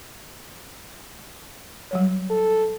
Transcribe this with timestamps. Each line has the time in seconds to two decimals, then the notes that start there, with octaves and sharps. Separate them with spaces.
1.91 F#3 G3 C#5
2.30 A4